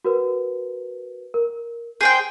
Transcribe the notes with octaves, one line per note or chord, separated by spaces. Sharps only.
F#4 A#4 B4
A#4
G#4 C5 G5 G6 C7